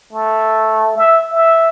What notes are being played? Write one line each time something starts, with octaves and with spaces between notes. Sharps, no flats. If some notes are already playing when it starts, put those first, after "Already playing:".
A3
E5
E5